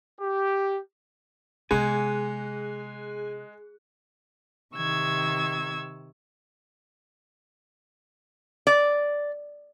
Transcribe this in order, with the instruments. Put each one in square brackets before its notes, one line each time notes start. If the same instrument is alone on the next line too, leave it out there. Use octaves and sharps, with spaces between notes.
[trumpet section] G4
[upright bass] C3 B3 [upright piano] G#3 [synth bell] G#4 F#6 [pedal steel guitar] G#5
[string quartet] C3 D#3 C#6 E6 G#6
[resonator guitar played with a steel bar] D5